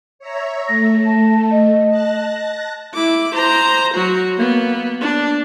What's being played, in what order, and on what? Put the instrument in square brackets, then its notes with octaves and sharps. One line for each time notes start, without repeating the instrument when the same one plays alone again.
[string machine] C#5 E5 A#5
[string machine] A3 [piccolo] A#6
[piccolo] A5
D#5
[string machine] A5 F#6 A#6
[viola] E4 D6
C5 A#5
F#3 F#4
A#3 B3
D4